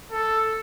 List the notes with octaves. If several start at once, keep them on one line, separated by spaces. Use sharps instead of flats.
A4